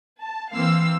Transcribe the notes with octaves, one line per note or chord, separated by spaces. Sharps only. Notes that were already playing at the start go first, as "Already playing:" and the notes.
A5
E3 A#3 C4 F5 E6 C7